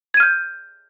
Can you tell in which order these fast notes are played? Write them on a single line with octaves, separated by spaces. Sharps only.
G#6 D#7 F6 G6